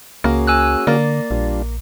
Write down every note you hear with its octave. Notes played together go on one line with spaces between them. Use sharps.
C#2 A#3 C#4 F#4 G#4
G#5 E6 F#6
D3 A#3 D5
A#1 G3 D4 F4